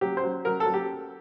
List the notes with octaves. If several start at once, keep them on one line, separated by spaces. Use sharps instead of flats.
F#3 G4
C5
F#3
F#3 A#4
A4
F#3
G4